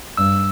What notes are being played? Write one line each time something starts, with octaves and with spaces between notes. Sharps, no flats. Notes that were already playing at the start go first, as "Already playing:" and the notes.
G2 E6